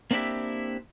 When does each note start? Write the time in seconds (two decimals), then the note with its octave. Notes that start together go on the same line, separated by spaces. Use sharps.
0.11 A#3 C4 D4 E4 G4 E5